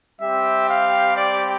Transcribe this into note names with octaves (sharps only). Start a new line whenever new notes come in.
G3 C4 G4 E5
F5
D5